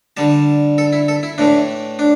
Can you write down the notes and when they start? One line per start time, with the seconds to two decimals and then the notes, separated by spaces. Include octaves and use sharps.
0.17 D3 G3 A5
0.78 A4
0.93 E4
1.08 A4
1.23 E4
1.38 A2 E3 A3 D4
1.99 D4